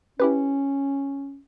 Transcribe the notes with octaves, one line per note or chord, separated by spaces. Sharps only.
C#4 E4 G4 B4